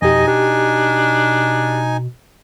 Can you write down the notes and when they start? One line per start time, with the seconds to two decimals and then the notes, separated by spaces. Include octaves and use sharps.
0.02 F2 B2 D#4 G4 D#5 G#5
0.28 D4 G4